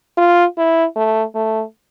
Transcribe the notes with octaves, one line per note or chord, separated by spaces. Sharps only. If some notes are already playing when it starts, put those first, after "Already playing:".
F4
E4
A3
A3